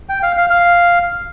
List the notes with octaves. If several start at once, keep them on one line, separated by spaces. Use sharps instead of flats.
G5
F5
F5
F5